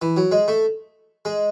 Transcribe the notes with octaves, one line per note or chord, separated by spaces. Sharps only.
E3
F#3
G#3
A3
G#3